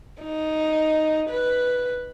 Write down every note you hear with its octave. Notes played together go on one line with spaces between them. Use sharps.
D#4
B4